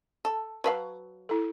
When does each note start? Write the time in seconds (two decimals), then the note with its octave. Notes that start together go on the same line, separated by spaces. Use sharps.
0.25 A4
0.64 F#3 B4 F5 A5
1.29 E4 A4